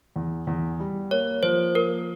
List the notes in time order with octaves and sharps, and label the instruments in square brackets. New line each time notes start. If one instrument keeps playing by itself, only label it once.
[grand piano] E2
E2
G3
[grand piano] A#3 [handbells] C#5
[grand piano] F3 [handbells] C5
[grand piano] A#3 [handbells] A#4